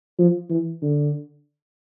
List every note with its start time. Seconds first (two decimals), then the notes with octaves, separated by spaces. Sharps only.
0.19 F3
0.50 E3
0.82 D3